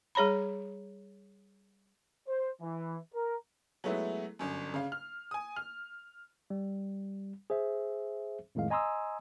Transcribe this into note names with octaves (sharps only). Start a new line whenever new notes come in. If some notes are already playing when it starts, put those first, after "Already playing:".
G3 G#4 C#5 A#5 B5
C5
E3
A#4
F#3 G#3 A3 B3 E4
G1 F#2
C#3 F5
F6
G#5 D#6
F6
G3
G#4 C5 E5
F2 A2 D#3 G#3 F5
D#5 G#5 A#5 C6 D#6 E6